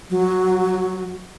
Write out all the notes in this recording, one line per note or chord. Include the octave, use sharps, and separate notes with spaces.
F#3